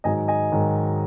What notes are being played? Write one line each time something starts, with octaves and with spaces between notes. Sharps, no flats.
G#2 D#3 F#3 D#5 G#5
D#5 G#5
G#2 D#3 F#3